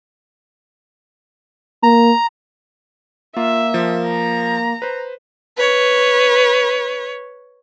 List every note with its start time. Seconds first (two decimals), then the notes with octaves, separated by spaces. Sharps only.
1.83 A#3 A#5
3.37 A#3 F4 E5
3.74 F3
4.07 A#5
4.82 B4 C5
5.57 B4 C#5